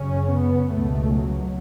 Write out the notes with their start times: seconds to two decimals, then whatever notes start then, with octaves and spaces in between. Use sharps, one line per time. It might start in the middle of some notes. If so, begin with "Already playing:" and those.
Already playing: F#2 C#3 C#4
0.31 B3
0.71 C#2 B2 A3
1.12 F#3